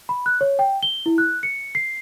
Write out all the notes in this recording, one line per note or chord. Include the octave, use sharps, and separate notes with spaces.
B5
F#6
C#5
G5
G7
E4
F#6
C#7
C7